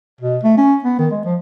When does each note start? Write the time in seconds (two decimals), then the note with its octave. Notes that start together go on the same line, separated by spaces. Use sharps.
0.21 B2
0.44 A3
0.58 C#4
0.84 B3
0.99 D#3
1.11 G#3
1.25 F3